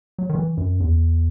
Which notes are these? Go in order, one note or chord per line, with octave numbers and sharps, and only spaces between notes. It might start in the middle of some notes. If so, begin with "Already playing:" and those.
F#3
D#3
E3
F#2
E2